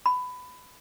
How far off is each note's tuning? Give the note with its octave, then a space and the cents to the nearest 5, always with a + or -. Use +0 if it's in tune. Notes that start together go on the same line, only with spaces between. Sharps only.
B5 +20